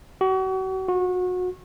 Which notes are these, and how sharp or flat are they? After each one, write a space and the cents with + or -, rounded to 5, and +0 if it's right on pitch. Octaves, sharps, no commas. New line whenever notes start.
F#4 +35
F#4 -30